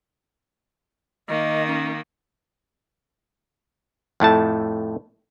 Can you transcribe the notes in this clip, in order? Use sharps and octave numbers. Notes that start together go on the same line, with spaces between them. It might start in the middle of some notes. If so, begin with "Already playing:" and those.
D#3 A#3 D#5
C#4
F2 A2 A3 A5